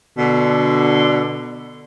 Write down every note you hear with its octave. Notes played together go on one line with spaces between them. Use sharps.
B2 D3